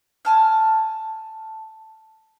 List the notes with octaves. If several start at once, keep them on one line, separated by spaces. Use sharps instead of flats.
G#5 A5 F6